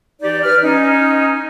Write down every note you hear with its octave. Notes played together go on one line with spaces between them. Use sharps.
E3 D#4 G4 D5
B4 F6
C#4 D#4